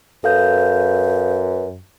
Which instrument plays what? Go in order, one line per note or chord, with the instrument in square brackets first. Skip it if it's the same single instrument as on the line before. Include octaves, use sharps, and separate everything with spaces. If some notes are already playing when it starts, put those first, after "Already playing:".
[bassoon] F#2 [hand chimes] A4 F5 G6 [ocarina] B4